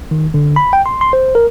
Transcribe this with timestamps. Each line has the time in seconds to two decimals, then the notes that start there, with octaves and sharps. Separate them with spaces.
0.11 D#3
0.34 D3
0.56 B5
0.73 G5
0.86 C6
1.01 C6
1.13 C5
1.35 A#4